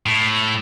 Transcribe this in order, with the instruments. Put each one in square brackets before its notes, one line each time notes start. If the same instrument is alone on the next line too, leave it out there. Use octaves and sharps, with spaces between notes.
[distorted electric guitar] A2